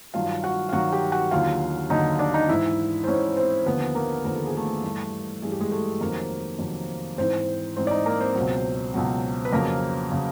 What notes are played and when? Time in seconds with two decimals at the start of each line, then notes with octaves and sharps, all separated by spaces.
0.14 G2 D#3 F#3 F4 F5
0.44 F#4 F#5
0.69 F5
0.73 G2 D#3 F#3 F#4 F#5
0.92 G4 G5
1.12 F#4 F#5
1.31 D#2 D3 F#3 F4 F5
1.90 D#2 D3 F#3 D#4 D#5
2.19 D4 D5
2.34 D#4 D#5
2.48 G#2 E3 E4 E5
3.04 C5
3.07 G#2 E3 C#4 C#5
3.36 C4 C5
3.66 D#2 D3 F3 B3 B4
3.95 A#3 A#4
4.25 D#2 D3 F3 A#4
4.35 A4
4.46 G#4
4.57 A3 A4
4.83 G2 E3
5.42 G2 E3 G#4
5.51 G4
5.60 G#3 G#4
5.72 A3 A4
6.01 F2 C3 D#3 F#3 A#3 A#4
6.59 F2 C3 D#3 F#3
7.18 G#2 E3 C4 C5
7.76 G#2 E3 C4 C5
7.87 D5
7.91 D#4 D#5
8.06 A#3 A#4
8.20 C4 C5
8.35 C#2 B2 F#3
8.94 C#2 B2 F#3
9.45 B4
9.53 F2 C#3 F#3 A#3 A#4
10.12 C#3 F#3